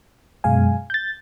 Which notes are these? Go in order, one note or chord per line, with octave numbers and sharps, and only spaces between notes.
F#2 B2 G#3 F5 G#5
G6 A6